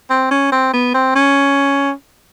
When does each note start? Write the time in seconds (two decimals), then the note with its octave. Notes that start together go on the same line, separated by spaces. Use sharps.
0.10 C4
0.31 C#4
0.52 C4
0.73 B3
0.94 C4
1.16 C#4